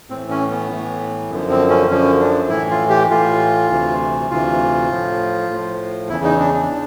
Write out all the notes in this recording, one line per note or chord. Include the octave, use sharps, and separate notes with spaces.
A2 E3 C4
C#4
B3
A2 E3
F#2 D3 F3 B3
C4
C#4
F#2 D3 F3 C#4
D4
A2 E3 E4
F4
G4
A2 E3 F4
D2 C3 E3
D2 C3 E3 F4
A2 F3
A2 F3
E2 C#3 E3 E4
D#4
D4
D4
C#3